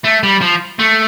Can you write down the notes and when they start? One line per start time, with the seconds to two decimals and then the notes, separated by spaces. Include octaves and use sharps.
0.04 A3
0.23 G3
0.41 F3
0.79 A3